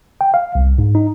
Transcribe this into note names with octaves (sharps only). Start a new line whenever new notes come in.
G5
F5
C2
G#2
D#4